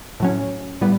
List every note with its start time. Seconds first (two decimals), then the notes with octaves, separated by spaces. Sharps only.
0.20 A2 F#3 C#4
0.81 A2 G3 B3